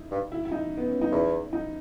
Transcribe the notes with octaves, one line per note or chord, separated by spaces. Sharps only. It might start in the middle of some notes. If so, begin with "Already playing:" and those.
Already playing: D#4 E4
G2
E4
E4
D#4
B3
C#4
D#4
E2 E4
D#4